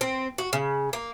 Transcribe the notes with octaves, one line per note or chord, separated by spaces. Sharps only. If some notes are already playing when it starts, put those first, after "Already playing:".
C4
F#4
C#3
A#3